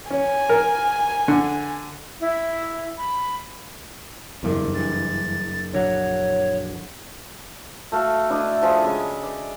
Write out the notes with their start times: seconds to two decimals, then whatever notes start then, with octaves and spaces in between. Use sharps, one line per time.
0.10 C#4 G#5
0.49 A#4
1.28 D3
2.20 E4
2.98 B5
4.43 F#1 E2 G2 D3 D4
4.74 G2 E3 A6
5.73 A#1 D3 F#3 C#5 F#5 A#6
7.92 A3 F#4 A4 F5
8.31 A3 D4 E4 D#5
8.63 F3 G#4
8.84 C#3 G#3 E5
9.23 D5